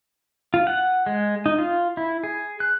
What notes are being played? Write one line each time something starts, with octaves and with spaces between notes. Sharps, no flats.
F4
F#5
G#3
D#4
F4
E4
G#4
F#6